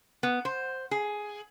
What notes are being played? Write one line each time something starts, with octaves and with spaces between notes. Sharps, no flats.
B3
C5
G#4